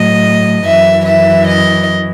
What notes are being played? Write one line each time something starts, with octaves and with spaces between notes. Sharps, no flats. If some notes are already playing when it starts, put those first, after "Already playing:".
Already playing: A2 F#3 D#5
F#2 E3 E5
E5
D#5